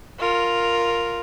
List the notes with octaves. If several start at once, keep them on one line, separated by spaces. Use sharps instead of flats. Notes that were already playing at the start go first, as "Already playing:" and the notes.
F4 A#4